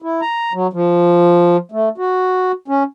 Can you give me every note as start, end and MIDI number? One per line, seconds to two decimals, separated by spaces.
0.02 0.21 64
0.22 0.53 82
0.53 0.67 54
0.73 1.57 53
1.72 1.89 57
1.98 2.52 66
2.68 2.83 61